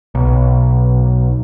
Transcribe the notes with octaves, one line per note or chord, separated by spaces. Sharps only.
B1